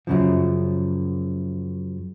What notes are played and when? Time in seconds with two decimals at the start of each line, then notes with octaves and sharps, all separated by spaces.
0.07 F#2 C#3 F3